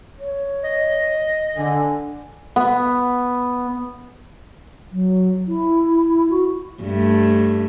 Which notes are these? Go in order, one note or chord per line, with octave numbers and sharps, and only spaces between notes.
C#5
D#5
D3 G#5
B3
F#3
E4
F#4
G2 A3